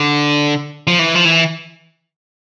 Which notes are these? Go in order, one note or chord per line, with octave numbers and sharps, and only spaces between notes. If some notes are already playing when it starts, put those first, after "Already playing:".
Already playing: D3
F3
E3
F3
E3